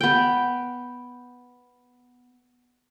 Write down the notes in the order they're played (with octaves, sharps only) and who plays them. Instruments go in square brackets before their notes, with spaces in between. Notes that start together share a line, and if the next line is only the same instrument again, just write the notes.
[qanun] B3 G5